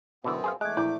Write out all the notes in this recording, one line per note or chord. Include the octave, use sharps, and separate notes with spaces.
F#2 B2 D3 E3 B3 C4
G#4 C5 F5
E2 G#3 A3 D6 F#6 G#6
A#1 E4 D5 G6